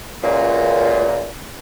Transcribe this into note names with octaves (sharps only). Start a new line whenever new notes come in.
C#2 F#2 A#2